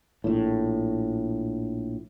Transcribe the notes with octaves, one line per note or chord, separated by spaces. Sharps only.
A#1 A2